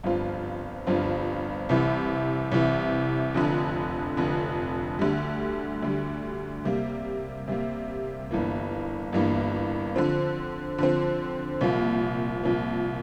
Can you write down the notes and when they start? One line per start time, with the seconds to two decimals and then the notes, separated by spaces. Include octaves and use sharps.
0.04 G1 G2 F3 C4 F4
0.87 G1 G2 F3 C4 F4
1.69 C2 C3 E3
2.52 C2 C3 E3
3.34 F1 F2 D3
4.17 F1 F2 D3
4.99 D2 D3 G3
5.83 D2 D3 G3
6.65 C3 G3 A#3
7.48 C3 G3 A#3
8.31 G1 G2 E3 A#3
9.13 G1 G2 E3 A#3
9.96 D3 F3 C4
10.78 D3 F3 C4
11.61 C2 A#2 F3 A#3
12.43 C2 A#2 F3 A#3